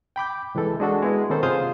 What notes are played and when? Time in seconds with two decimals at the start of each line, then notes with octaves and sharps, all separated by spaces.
0.16 G5 B5 D6 G6
0.55 C2 E3 G#3 A4
0.80 G#3 D4 F#4 A4
1.02 G#3 B3 E4
1.30 D#3 B3 C#4 D#4 A4 C5
1.43 C3 F4 G#4 C5 F5 D#6